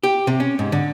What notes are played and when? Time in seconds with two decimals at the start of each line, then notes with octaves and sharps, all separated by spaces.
0.03 G4
0.27 C3
0.40 C#4
0.59 G#2
0.72 D3